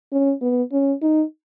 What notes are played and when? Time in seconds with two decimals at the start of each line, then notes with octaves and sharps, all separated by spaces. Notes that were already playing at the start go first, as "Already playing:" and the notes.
0.12 C#4
0.41 B3
0.72 C#4
1.02 D#4